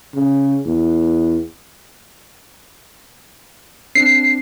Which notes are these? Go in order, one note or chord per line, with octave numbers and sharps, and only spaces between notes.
C#3
E2
C4 D4 C7